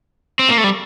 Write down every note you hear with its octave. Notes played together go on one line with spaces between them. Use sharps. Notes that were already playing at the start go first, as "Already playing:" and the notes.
C4
A#3
A3
G3